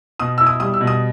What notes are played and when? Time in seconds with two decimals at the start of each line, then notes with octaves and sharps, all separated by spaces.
0.20 B2 D#6
0.38 E4 E6
0.47 D#6
0.60 G3 D#6
0.74 E6
0.80 B2
0.87 D#6